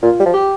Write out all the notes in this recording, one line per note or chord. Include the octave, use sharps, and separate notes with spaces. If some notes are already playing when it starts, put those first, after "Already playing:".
A#2 F4
G3
F3
G4